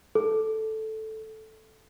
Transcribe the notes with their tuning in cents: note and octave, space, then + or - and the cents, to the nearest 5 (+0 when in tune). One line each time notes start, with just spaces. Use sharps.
A4 -5